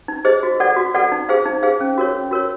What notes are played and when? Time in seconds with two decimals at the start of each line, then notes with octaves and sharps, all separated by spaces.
0.08 D#4
0.25 G#4 C5 D#5
0.43 F#4
0.60 A4 D5 F#5
0.76 F#4
0.94 A4 D5 F#5
1.12 D#4
1.29 G#4 C5 F5
1.46 D#4
1.63 G#4 C5 F5
1.81 C#4
1.98 F#4 A#4 C#5
2.14 C#4
2.31 F#4 A#4 C#5